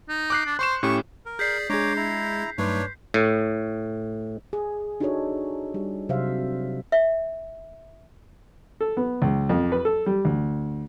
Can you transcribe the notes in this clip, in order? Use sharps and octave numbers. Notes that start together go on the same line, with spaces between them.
D#4
D6 F#6 C7
D4
C5 C6 C#6 E7
A2 C#4 G4 C#6
A#4
G#4 D5 G6 B6 C7
G#3 D4 G#4 C#5 A#5 D6 G#6
E4 A#5
G2 F#3 A3 D4 D#4 B4 C#5 C6
A2
G#4
D4 D#4 F#4 G#4 A4 C#5
G3
C3 F#3 C5 E5 F5
E5
A4
B3
C#2
F2
B4
A4
G3
D2